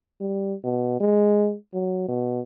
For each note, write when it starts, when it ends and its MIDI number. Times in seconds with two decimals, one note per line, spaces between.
0.21 0.54 55
0.64 0.99 47
1.00 1.55 56
1.74 2.08 54
2.09 2.40 47